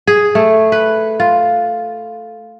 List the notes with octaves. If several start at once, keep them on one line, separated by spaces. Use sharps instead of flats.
G#4
A3
B4
F4